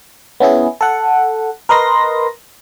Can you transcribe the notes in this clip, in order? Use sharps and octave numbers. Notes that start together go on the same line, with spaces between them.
B3 C#4 E4 G#4
A4 F#5
A#4 B4 D#5 C6 A#6